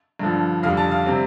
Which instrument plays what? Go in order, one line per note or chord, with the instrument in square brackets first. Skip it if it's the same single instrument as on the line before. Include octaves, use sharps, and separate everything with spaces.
[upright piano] G2 D3 F3
F2 D3 G3 F5
A5
F5
C3 G3 C4